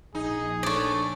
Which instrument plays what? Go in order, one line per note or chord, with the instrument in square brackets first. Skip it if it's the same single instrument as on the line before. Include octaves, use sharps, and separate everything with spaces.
[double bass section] A#1 [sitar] D#4 [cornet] G#4
[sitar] A3 D4 [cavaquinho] C#5 D5